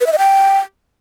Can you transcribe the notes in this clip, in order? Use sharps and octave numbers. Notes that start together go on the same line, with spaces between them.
B4
E5
D#5
G5